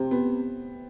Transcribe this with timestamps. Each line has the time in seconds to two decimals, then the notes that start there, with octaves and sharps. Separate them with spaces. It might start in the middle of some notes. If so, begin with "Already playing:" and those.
Already playing: C3 C4
0.11 B3